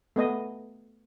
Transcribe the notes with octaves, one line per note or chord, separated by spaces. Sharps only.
A3 B3 D#5